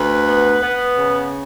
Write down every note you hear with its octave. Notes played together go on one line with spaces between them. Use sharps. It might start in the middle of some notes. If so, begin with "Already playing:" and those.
Already playing: D2 B4
B3
B3
C#3